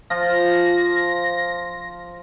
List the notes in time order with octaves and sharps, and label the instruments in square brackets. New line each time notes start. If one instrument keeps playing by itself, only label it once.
[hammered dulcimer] F3 F4 [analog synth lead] A#6